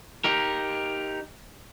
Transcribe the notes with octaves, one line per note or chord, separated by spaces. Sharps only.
D#4 G4 A#4